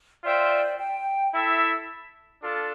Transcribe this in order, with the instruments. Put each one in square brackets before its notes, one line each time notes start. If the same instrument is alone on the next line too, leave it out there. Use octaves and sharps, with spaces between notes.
[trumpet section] F4 C5 E5 G5 [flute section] D5
[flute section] G5
[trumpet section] E4 A4 E5
D4 F4 A4